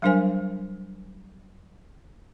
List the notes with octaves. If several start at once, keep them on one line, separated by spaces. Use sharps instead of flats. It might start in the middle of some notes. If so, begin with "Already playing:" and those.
F#3 G3 D4 A#4 C5 G#5